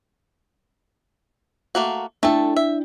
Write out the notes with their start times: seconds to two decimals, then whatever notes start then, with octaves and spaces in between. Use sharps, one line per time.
1.75 A3 A#3 F#4
2.23 A3 D4 E4 A4 G5
2.56 E5